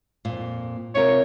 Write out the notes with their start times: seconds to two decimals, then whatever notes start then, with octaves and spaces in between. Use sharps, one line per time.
0.25 F2 A#2
0.95 C3 F4 A#4 C#5